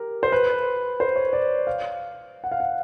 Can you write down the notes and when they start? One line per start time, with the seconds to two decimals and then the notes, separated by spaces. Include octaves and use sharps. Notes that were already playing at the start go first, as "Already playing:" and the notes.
Already playing: G4 A#4
0.23 C5
0.32 B4
1.00 C5
1.16 C#5
1.33 D5
1.67 F5
2.44 F#5
2.52 F5
2.60 F#5